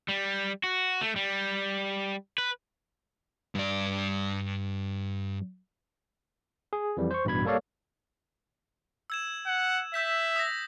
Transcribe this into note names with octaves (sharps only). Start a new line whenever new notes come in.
G3
F#4
A3
G3
B4
G2 D5
G#4
F2 E3 G3
C5 C#6
A1 G2 B2 B5 G#6
G3 A#3 A4 C#5 D5 F5
E6 G#6 E7
F#5
E5 E6 G6 B6
D#6 E6 A#6